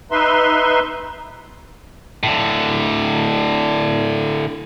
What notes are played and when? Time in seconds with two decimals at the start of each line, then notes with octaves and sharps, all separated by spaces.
0.11 D#4 B4 E5 C6
2.23 A2 D3